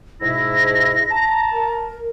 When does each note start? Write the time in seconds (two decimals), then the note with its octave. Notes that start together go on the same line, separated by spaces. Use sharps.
0.22 G#2 B2 E4 A#6
1.11 A5 A#5
1.52 A#4